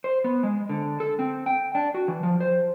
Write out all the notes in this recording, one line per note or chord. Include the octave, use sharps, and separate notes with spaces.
C5
B3
G#3
D3
A4
C4
G5
D4
F#4
E3
F3
C5